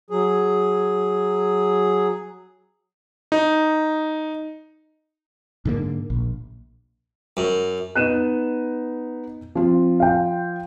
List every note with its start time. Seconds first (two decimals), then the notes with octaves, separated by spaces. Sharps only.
0.10 F#3 G#4
3.32 D#4
5.65 G#2 D3 A#3
6.10 A#1
7.37 F#2
7.95 B3 D#4 F#6 D#7 E7
9.55 F3 C4 F4
10.00 F5 G5